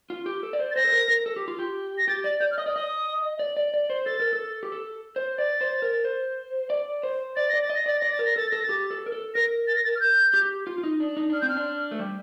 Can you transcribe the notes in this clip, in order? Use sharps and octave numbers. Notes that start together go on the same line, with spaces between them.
F4
G4
A4
D5
C5
A6
C5 A#6
A4
A#4
A#4
A4
G4
F4
G4
A#6
G4 A6
D5 A6
D5 G6
F6
D#5 D#6
D5
D#5 D#6
D5
D5
D5
C5
A4 A6
A#4
A4
G4
A4
C5
D5 A6
C5
A#4
C5
D5
C5
D5 A6
D5 A#6
A6
D#5
A#6
D5 A6
D5 A#6
A6
A#4
A#6
A4 A6
A4 A#6
A6
G4
A4
A#4
A4
A#4 A#6
A6
A#6
A6
F6
G6
G4
F4
F4
D#4
D4
D#4
D4 F6
C4 G6
F6
D4
A3
G3